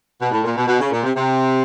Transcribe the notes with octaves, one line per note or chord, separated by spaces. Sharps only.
B2
A2
A#2
B2
B2
C#3
A#2
C3
C3